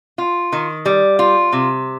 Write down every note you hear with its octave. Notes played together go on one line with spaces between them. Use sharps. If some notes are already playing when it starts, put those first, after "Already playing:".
F4
D#3
G3
F4
C3